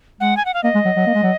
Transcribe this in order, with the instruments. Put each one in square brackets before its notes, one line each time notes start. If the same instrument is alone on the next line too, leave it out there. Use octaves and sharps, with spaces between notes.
[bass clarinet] G#3 [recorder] F#5
[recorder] G#5
F#5
F5
[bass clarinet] A#3 [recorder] D#5
[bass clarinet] G#3
F#3
F#3
A#3
G#3
F#3